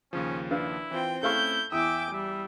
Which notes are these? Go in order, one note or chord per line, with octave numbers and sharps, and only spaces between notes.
D#2 C#3 F3 C#4
D4 E4 B4 F5
E3 C4 F4 G5
A3 C4 C#4 E4 A4 F5 C#6 G6
E2 E5 G5 G#5 D6 D#6
G3 E5